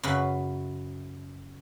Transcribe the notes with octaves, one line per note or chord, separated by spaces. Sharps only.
F#2 C#3 B4 B5